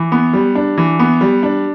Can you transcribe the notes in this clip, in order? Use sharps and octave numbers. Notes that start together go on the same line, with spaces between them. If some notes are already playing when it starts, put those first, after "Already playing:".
Already playing: E3
B3
G3
D4
E3
B3
G3
D4